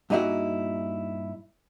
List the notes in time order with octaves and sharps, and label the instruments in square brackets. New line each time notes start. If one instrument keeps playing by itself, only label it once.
[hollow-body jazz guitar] G2 A#2 D#4 E4 F#4 G#4